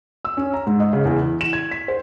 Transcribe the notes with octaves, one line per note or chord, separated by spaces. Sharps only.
E6
C#4
A#5
G#2
D#5
C#3
E2
E3
E7
G#6
B6
C5